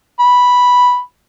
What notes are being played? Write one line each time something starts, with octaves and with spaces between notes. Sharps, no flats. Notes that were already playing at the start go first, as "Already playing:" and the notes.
B5